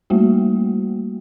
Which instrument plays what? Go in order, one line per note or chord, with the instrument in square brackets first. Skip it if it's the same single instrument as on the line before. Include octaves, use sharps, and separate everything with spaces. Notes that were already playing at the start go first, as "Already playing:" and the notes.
[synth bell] G3 A3 A#3 F#4